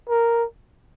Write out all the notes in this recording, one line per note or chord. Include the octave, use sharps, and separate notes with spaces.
A#4